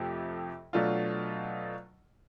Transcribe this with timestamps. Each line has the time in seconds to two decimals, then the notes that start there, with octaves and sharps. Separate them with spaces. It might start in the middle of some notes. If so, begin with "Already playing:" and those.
Already playing: F2 C3 F3 A3
0.73 B2 F#3 A3 D4 F4